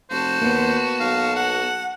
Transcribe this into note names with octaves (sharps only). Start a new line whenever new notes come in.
F1 F#4 C5 A5
D#2 A#3 B3
B1 F5
F#5